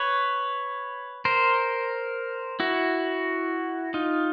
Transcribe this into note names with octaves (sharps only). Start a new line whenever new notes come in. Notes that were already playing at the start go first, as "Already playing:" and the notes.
Already playing: B4 C#5
A#4 C5
E4 F#4
D#4 F4